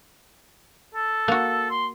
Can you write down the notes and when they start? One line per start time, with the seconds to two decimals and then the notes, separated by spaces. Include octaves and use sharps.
0.95 A4
1.28 A#3 F#4
1.71 C6